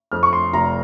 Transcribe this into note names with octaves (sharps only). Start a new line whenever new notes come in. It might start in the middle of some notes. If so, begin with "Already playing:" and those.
F2 F6
C#6
C6
F1 A#5